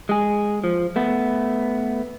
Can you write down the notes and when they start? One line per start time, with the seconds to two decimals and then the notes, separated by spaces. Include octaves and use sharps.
0.09 G#3 G#4
0.64 F3
0.96 A3 B3